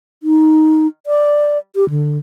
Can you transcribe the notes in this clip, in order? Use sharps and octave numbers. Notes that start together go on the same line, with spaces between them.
D#4
D5
G4
D3